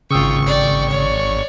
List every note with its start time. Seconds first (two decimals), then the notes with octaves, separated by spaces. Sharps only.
0.11 G#1 C#3 F4 G5 C#6 D#6 E6
0.47 D5 G5
0.90 C#5 D5